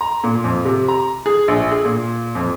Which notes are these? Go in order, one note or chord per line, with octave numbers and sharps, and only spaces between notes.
A#5
A#2
F2
C3
A#5
G#4
A#1
G#4
A#2
F2